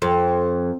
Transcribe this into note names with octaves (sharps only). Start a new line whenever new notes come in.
F2